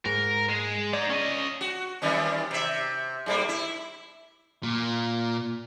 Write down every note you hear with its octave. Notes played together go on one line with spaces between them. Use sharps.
G#2 A#4
G#3
D#4 G#4 D5
C#4 D#5
F#4
D#3 G3 C#4
C3 E5
G#2 G3 A#3
E4
A#2